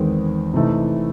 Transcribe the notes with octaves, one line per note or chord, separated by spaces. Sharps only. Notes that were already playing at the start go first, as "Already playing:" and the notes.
Already playing: E2 D#3 G#3 C4
C3 E3 A3 D#4